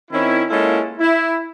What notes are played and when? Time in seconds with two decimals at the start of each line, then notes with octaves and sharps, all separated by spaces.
0.10 D#3 C4 C#4 E4
0.49 G#3 A#3 C#4 E4 F4 A4
0.99 E4